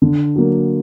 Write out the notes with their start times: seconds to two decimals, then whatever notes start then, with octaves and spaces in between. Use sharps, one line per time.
0.02 D3
0.36 F#3 A#3